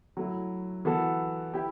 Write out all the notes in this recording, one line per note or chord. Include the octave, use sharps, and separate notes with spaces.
F#3 A3 E4
E3 B3 F#4 A4
E4 G4